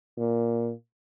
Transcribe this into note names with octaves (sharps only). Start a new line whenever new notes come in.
A#2